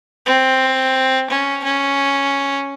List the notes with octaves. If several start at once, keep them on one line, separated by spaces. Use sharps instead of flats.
C4
C#4
C#4